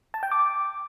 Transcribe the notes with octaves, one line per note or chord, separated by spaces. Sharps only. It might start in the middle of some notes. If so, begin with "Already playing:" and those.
A5
G5
D6